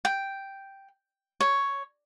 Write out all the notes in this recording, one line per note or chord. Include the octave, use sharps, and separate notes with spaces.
G5
C#5